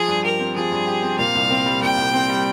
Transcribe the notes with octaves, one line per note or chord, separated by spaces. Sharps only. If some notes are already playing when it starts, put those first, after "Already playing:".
Already playing: F3 G#4
G2
G4 A#4
C4
F3 G#4
G2
G4
C4
A#2 F5
C2
C4
G3
A#2 G5
C2
C4
G3